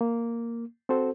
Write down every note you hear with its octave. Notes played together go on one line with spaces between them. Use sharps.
A#3
C4 F#4 A4 C5